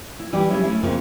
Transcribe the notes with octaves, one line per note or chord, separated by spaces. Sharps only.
E4
E3 G3 G4 D5
C#3 G3 C#4 E4 G#4
A3 C#4 E4
F2 C#3 F3 A#3